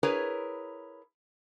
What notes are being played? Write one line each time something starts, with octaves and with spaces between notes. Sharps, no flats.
E4 G#4 A#4 B4 C#5